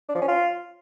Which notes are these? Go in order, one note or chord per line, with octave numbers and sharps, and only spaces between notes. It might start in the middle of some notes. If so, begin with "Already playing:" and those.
D4
F3
C#4
F4